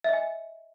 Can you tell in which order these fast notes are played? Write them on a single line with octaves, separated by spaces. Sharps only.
E5 D#5 G#5